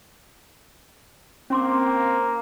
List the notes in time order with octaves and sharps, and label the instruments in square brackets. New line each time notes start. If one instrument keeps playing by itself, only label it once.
[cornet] A#3 [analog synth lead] C4 [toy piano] C#4 C6 D6